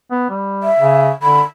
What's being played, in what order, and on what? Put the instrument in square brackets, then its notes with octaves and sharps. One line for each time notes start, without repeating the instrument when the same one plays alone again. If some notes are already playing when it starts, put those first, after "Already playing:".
[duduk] B3
G3
[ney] E5
[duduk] C#3
[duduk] D3 [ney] B5